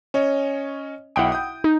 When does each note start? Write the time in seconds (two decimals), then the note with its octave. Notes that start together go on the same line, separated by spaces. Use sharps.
0.14 C#4 C#5 D#5
1.16 B1 E4 F#5 G5 D#6 D7
1.32 D#6 G6
1.64 D#4